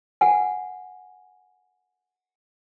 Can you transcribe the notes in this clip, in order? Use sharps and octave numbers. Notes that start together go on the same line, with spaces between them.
F#5 G#5